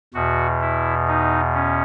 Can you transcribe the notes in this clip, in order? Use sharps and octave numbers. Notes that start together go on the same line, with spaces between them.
E2 B2 F#4
E4
D#4
C#4